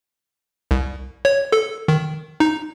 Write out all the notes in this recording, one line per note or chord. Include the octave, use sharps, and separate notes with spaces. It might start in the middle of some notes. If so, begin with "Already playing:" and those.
C2
C#5
A4
D#3
D#4